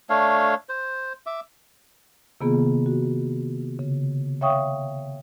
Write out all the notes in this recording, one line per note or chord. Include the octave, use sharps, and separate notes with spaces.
A3 D4 C#5 F5
C5
E5 D6
C3 D#3 A#3 B3 F4 G#4
F#4
C#3
C#5 E5 F5 G5 C#6 D#6